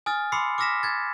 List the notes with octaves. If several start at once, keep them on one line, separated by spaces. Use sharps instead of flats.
G#5 D#6 F6 A6
B5 C6 D6 E6 C7 C#7
D6 E6 F6 A#6 B6 E7
G#6 A6